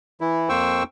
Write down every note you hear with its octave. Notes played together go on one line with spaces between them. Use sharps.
E3 E4
F2 A#3 C5 G5 C#6 E6